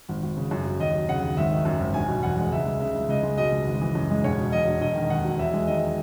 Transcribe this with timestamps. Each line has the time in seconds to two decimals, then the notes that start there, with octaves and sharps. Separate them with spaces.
0.09 G#1
0.23 G#1
0.37 C#3
0.51 F#2
0.65 F#3
0.80 D#2 D#5
0.94 F#3
1.09 C#3 F#5
1.22 D#2
1.37 G#1 E5
1.51 D#3
1.65 F#2
1.80 G#1
1.94 E1 G#5
2.08 B2
2.23 E2 F#5
2.37 G#3
2.52 C#2 E5
2.66 G#3
2.81 C#3 E5
2.95 C#2
3.09 C#2 D#5
3.23 G#3
3.38 B2 D#5
3.52 C#2
3.66 G#1
3.81 E3
3.95 F#2
4.10 G#3
4.24 E1 C#5
4.39 B2
4.52 E2 D#5
4.67 E1
4.81 E1 D#5
4.95 D#3
5.10 D#2 F#5
5.24 F#3
5.39 E2 E5
5.54 G#3
5.67 D#3 D#5